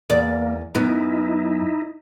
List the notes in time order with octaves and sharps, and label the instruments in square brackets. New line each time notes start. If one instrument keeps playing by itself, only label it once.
[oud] E2 D5 [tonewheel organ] A#3
[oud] F#2 B3 [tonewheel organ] D#4 E4